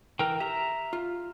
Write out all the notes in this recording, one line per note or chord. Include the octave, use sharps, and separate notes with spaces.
E3 A#4 G5
G4 E5 A#5
F4